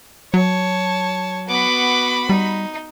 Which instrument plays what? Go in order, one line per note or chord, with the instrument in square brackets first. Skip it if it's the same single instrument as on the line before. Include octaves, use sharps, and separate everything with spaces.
[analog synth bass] F#3 [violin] C#5 A5
[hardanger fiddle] B3 D6 [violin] F#4 B5
[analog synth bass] G3 [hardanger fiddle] D#4